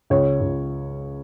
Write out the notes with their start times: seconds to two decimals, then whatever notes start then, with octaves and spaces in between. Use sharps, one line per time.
0.10 C#2 C#5
0.41 C#2